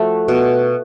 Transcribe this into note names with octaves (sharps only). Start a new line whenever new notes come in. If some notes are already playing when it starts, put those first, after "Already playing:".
Already playing: F3 A3 F#4
B2